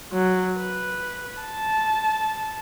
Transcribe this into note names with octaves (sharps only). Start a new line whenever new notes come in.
F#3
B4
A5